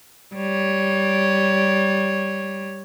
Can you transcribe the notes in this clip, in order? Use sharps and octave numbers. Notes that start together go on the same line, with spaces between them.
G3 C#5